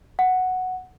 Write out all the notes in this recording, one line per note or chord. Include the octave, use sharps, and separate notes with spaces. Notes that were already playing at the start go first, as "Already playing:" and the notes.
F#5